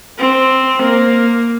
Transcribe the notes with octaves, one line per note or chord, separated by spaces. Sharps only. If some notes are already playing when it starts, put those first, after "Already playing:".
C4
A#3